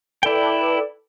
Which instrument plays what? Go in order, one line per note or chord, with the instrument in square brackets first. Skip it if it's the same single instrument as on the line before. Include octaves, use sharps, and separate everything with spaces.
[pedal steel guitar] E4 G5 [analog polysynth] A4 B4 D5